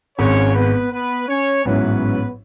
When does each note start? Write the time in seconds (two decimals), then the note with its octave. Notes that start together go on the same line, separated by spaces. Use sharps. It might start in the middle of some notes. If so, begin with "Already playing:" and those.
0.18 G#1 G#2 G#3 C#4 C#5
0.55 B3 B4
0.92 B3 B4
1.28 C#4 C#5
1.65 A1 G#2 F#3 B3 C#4 E4 B4